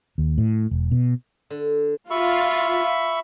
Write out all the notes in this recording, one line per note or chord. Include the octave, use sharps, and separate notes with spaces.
D#2
A2
E1
B2
D3
F4 E5 B5 C#6